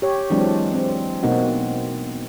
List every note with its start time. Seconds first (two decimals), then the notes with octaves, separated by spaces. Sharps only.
0.02 G4 C#5
0.30 E3 F#3 G#3 C4 D4
0.74 C4
1.23 B2 A#3 C4 D#4 F#4